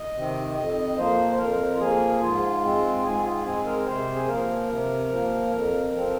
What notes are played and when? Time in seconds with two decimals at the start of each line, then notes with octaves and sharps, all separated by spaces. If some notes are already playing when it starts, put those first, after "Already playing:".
Already playing: D#5
0.14 C3 D#3 C4
0.56 F2 D#5
0.97 F3 A#3 C5
1.32 C5
1.38 F2 A#4
1.74 F4
1.79 F3 A#3 G#4
2.21 G#2 F4
2.62 G#3 C4
3.03 G#2 G#4
3.23 F4
3.44 G#3 C4 G#4
3.66 A#4
3.86 C3 C5
4.15 G#4
4.27 F3 A#3 A#4
4.69 C3
5.10 F3 A#3
5.51 F2
5.92 F3 C4